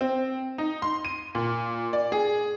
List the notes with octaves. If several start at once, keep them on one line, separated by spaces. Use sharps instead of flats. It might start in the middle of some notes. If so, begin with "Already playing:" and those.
C4
D#4
C6
D#7
A#2
D5
G#4